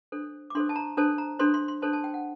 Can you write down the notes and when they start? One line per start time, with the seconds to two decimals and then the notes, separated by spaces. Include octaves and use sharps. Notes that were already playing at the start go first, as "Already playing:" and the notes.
0.12 D4 A4 C5
0.50 D6
0.55 D4 A4 C5 C6
0.69 A5
0.76 A#5
0.97 D4 A4 C5 A5
1.18 A#5
1.39 D4 A4 C5 C6
1.54 C6
1.68 C6
1.82 D4 A4 C5 A5
1.93 A5
2.04 G5
2.14 F#5